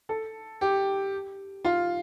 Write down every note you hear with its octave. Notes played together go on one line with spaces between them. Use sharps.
A4
G4
F4